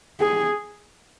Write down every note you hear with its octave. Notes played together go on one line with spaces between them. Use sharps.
G#4